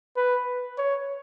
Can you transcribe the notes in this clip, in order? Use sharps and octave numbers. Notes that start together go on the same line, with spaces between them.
B4
C#5